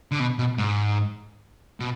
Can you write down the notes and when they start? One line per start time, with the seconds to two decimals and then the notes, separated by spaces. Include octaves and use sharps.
0.11 D3
0.20 B2
0.39 B2
0.58 G#2
1.80 B2